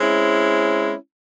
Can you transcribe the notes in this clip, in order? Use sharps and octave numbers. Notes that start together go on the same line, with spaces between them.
G#3 C4 C#4 E4